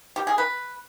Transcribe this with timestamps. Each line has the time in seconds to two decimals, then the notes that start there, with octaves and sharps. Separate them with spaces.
0.16 G4
0.27 G#4
0.38 B4